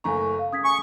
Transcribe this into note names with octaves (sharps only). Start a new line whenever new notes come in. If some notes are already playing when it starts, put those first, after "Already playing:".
F#1 A3 G#5 A#5 C#6
F5
C#3 D#6 G#6 B6
G#5 C#6 D#6